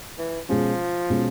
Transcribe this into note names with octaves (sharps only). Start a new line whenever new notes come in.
E3
B2 F3 G#3 C#4 F4
B2 G#3 C#4 F4